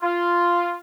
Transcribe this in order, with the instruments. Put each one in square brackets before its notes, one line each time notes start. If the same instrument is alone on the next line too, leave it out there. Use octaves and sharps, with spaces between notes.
[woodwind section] F4